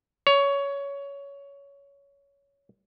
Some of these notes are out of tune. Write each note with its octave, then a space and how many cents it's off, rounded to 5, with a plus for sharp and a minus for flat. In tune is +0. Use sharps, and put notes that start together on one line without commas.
C#5 +15